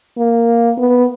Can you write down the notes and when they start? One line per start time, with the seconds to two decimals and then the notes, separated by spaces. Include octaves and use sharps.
0.17 A#3
0.78 B3